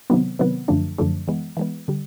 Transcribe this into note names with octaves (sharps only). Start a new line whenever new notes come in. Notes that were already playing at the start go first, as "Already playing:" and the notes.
C3 D#3 F#3 B3
C3 D#3 F#3 B3
F#2 D3 F3 A3 D4
F#2 D3 F3 A3 D4
E3 G#3 B3
E3 G#3 B3
D3 G3